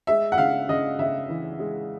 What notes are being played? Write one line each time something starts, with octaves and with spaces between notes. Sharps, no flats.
G#3 E5
F#5
C#3 F5
C#3 D#5
C#3 E5
E3
G#3